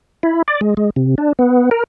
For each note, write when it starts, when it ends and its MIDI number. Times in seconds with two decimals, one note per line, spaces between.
0.23 0.42 64
0.48 0.61 74
0.61 0.74 56
0.77 0.90 56
0.96 1.15 48
1.18 1.33 62
1.39 1.70 59
1.71 1.84 70